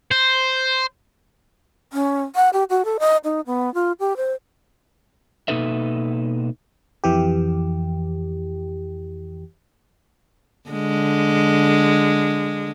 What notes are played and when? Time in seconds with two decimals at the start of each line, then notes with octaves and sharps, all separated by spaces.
0.11 C5
1.93 C#4
2.35 F#5
2.53 G4
2.70 F#4
2.85 A4
3.00 D#5
3.24 D#4
3.46 B3
3.74 F4
4.00 G4
4.17 C5
5.48 B2 A#3 D#4 A4 B4 E5
7.04 F2 E3 G4
10.69 D3 G#3